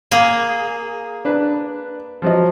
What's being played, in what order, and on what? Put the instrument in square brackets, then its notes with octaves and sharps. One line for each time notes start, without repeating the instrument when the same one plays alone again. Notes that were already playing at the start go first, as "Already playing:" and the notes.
[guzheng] A#3 G#4
[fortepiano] D4 B4
F3 F#3 D#5